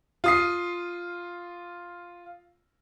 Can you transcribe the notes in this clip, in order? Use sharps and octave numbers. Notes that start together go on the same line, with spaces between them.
F4 D#6 C7